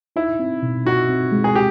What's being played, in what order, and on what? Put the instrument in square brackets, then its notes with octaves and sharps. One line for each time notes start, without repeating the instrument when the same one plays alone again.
[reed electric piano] D#4 [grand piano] E4
[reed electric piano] C4
B2
[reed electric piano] D#4 [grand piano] F#4
[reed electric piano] C4
G#3
[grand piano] G#4
G4